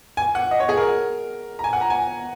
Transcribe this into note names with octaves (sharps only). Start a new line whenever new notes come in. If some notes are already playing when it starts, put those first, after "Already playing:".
G#5
F#5
D#5
C#5
G#4
A#4
A#5
G#5
F#5
A#5
G#5